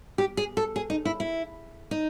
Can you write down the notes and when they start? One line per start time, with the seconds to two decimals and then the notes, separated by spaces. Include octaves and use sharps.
0.18 G4
0.37 G#4
0.57 A4
0.76 G#4
0.90 D#4
1.05 E4
1.20 E4
1.91 D#4